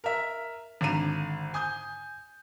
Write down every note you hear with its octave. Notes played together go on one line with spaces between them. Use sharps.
A#4 E5
G#1 D3 A#5 D#7 E7
G#5 D#6 G6